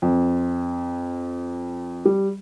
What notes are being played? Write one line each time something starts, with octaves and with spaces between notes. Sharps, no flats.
F2
G3